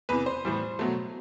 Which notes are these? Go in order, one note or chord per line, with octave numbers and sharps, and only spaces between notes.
E2 C3 E3 B4
C5
A2 E3 G3
B2 F#3 A3